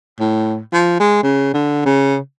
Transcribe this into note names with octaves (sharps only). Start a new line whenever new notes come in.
A2
F3
G#3
C#3
D3
C#3